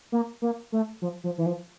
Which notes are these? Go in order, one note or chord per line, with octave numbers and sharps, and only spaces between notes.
A#3
A#3
A3
F3
F3
E3
F3